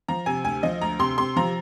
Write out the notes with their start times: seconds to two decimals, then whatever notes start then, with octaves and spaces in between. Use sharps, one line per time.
0.08 F3 A#5
0.26 C3 G#5
0.44 D2 G#5
0.63 F3 D#5
0.81 D2 A#5
0.99 C3 C6
1.18 C3 C6
1.36 F3 A#5